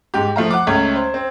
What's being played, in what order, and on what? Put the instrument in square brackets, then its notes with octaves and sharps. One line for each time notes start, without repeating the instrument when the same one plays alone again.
[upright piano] G#2 G4
F3 A3 F5 A#5
F#5 D6
C#2 A3 C#4 G#6
C5
C4